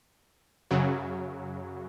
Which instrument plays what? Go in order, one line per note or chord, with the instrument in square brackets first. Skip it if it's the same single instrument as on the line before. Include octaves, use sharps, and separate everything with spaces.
[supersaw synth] F#2 C#3 F#3